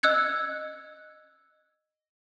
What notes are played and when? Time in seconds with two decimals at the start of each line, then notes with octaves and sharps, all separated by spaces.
0.03 D#5 E6 F#6 G#6 C#7